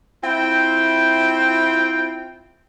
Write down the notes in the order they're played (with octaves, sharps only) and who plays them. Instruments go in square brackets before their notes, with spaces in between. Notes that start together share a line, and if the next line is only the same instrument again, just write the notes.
[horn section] C4 E4 F4 G5